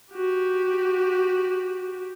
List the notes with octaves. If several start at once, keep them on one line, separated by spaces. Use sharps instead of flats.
F#4 G4